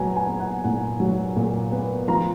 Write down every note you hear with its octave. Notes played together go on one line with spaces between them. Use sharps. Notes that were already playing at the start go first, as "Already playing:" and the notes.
Already playing: A#2 F#3 B3 F#5 G#5 A#5
G#5
B3
F#5
A#2 F#5
F#3
A#2
B3
F3 A#5